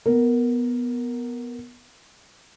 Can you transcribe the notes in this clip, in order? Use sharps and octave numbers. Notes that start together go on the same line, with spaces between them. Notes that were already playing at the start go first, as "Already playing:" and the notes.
B3 A#4